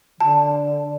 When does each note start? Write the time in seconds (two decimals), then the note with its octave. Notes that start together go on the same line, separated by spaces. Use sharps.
0.17 E3
0.20 D3 A5